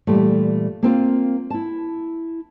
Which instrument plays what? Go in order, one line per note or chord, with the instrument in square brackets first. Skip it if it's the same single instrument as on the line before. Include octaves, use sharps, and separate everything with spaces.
[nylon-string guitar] A#2 E3 G3 A3
A#3 C4 F4
E4 A5